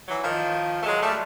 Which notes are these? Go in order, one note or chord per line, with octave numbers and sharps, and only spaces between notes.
E3 F#3
D#3 F3
A3
F#3 G#3
G3 A3